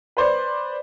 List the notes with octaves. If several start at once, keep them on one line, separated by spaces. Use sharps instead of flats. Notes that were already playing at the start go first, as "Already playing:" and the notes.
B4 C5 D5